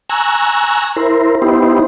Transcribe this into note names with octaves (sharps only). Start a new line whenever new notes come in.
G#5 A#5 C#6 E6 F#6
E4 A#4 C5
B3 D#4 E4 G4 C5